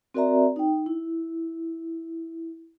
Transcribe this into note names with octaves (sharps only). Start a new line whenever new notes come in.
C4 F#4 A#4 D5 E5 A#5
D#4 G5
E4